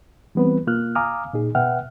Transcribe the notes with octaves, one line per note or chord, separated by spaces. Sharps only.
E3 G3 B3 C4 B4
B2 A#3 F4 F6 F#6
F5 G#5 A#5 D6 D#6 F6
A#2 D#4 G#4
B2 B4 E5 F#5 G5 F6